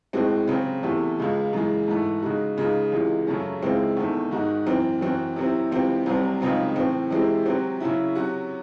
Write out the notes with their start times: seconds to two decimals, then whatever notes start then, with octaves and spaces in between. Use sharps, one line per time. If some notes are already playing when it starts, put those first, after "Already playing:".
0.13 A2 G#3 C4 F#4
0.48 C#3 F#3 C4
0.83 E2 C3 E3 A3
1.18 C#2 C#3 G#3
1.53 F#2 C#3 E3 G#3
1.88 G#2 E3 A3
2.22 C#3 G#3 D#4 F#4
2.57 C#2 C#3 G#3 D#4
2.92 C#2 C3 E3 G#3
3.27 F#2 C#3 F#3 A3 C#4
3.62 C#2 C#3 G#3 C4 E4
3.97 E2 D#3 A3
4.31 G#2 D#3 G#3 D#4 F#4
4.66 F#2 E3 C4
5.01 F#2 E3 C4 F#4
5.36 C3 F#3 C4 E4
5.71 C#2 C3 E3 C4
6.06 C2 C3 F#3 C4
6.41 C#2 C#3 F#3 C4 D#4
6.76 A2 E3 C4
7.10 C3 E3 G#3 C4 E4
7.45 C3 F#3 C4 F#4
7.80 C#3 F#3 C#4 E4
8.15 C3 F#3 C#4 F#4